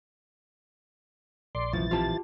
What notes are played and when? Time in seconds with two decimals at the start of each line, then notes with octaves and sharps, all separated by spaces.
1.55 A#1 D5 C6
1.73 F1 F#2 E3 F3 A6
1.91 D1 F3 C4 F4 G4 A5